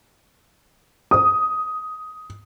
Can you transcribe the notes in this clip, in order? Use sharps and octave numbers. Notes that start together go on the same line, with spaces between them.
D#6